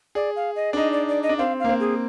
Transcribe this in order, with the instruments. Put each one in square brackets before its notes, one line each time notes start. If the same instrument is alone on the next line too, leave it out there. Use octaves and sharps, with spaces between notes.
[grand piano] G#4 [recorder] D5
[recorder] F5
D#5
[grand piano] D4
[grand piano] D#4 [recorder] D#5
[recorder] D5
D5
D#5
[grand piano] D4
[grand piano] C4 [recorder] F5
[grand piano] A#3 [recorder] F5
[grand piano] C4
[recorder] G#4